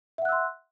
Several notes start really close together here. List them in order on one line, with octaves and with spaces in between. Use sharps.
E5 F#5 F#6 E6 C6